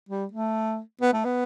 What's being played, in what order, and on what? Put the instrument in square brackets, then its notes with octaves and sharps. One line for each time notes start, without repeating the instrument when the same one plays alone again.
[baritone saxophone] G3
A3
B3
A3
B3